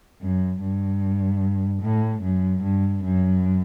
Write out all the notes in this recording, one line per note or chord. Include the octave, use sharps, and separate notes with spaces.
F#2
G2
A2
F#2
G2
F#2